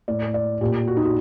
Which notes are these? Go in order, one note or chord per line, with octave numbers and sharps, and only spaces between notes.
A2 D5
D5
A#2 G4
F#4
D#4
F#4